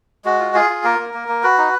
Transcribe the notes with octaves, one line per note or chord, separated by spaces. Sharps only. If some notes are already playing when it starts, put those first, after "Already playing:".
G#3 F#4
F4
F4 G#4
F4
A#3 A#4
A#3
A#3
A#3
F#4 B4
D#4